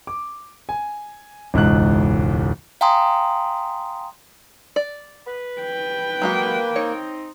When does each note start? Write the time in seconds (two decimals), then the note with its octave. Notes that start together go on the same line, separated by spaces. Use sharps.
0.07 D6
0.69 G#5
1.54 E1 C#2 G#2 F#6
2.81 F5 G5 G#5 A#5 C6 D#6
4.76 D5
5.27 B4
5.61 G5
6.22 F#3 G#3 A#3 F#4
6.76 C4 D#4 C#5